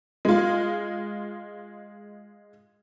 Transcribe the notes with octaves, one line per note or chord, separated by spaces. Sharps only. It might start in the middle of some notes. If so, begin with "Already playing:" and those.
G#3 F4